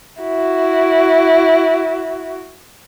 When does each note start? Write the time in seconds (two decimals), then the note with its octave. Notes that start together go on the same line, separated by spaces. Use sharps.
0.22 E4 F#4